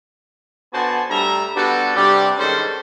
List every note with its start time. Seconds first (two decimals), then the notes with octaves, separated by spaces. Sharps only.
0.73 D3 B3 F#4 C5 G#5 A5
1.10 A2 G3 D4 E5 A#5
1.56 G3 B3 D4 F#4 A4 B4
1.96 G2 C3 G3 D4 G4
2.39 G#2 D#3 C#4 A4 C5 B5